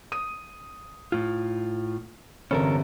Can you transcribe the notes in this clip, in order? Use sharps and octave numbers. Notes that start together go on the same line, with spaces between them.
D#6 D#7
A2 F4
G1 E2 C3 C#4 A4 A#4